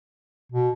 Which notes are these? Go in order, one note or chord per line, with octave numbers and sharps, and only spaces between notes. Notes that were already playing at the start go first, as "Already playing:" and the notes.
B2